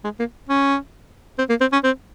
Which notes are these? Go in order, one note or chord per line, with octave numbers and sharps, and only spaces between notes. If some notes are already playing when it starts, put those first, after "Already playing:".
G#3
A#3
C#4
C4
A#3
C4
C#4
C4